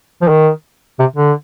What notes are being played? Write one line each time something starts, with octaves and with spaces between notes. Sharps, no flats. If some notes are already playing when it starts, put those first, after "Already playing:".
F3
D#3
C3
D3